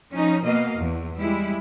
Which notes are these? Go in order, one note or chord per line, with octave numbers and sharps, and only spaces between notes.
F3 C#4 D#4
B2 A#3 D#5 F5
E2
G3 G#3 E4